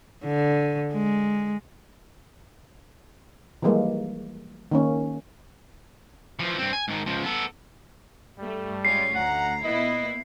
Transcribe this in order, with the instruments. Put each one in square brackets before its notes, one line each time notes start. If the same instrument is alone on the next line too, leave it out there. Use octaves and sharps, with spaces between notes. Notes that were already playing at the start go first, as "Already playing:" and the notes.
[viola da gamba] D3
G#3
[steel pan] E3 F3 G3 G#3 A#3
D#3 A#3 C#4
[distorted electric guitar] E3 F3
G2 C4
G#5
G#2 D#3
C#2 F3
B3 A4
[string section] G2 A3 [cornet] G3
[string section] G#3 C#4 F4 [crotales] C7
[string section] D2 A#5 [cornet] F#5
[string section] A#2 B3 E4 [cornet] D#5